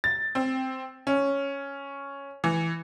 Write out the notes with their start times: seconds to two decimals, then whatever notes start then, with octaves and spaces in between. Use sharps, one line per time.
0.04 A6
0.35 C4
1.07 C#4
2.44 E3